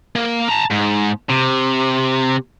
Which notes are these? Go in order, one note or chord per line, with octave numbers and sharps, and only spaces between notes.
A#3
A5 A#5
G#2
C3